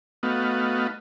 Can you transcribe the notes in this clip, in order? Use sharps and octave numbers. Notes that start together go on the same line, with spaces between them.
A3 B3 D#4 F#4 F5